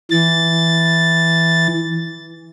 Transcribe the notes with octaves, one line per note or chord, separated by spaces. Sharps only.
E3 A6